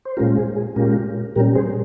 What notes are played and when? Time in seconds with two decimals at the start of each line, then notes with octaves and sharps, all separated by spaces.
0.05 C5
0.17 A#2 G#3 C#4 F4 G4 A#4
0.37 G#4
0.56 G#4
0.76 A#2 G#3 C#4 F4 G4 A#4
1.36 A#2 G3 C#4 G4 A#4
1.55 G#4 C5